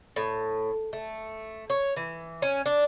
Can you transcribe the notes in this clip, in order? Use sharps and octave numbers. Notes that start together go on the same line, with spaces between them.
A2
A3
C#5
E3
C#4
D4